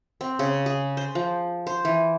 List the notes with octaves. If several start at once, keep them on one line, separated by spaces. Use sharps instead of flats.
C4
C#3
G#4
C5
F3
C5
E3